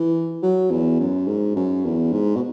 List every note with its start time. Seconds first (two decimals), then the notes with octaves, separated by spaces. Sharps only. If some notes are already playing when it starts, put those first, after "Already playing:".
Already playing: E3
0.42 F#3
0.71 E2
1.00 F#2
1.27 G#2
1.56 F#2
1.84 E2
2.12 G#2
2.35 B2